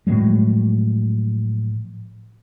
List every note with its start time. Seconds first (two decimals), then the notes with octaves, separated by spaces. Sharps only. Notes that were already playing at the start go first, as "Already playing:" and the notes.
0.07 A2 F3 F#3 G#3